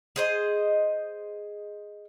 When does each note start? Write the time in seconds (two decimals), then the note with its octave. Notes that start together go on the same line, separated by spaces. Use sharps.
0.16 G#4 C5 D#5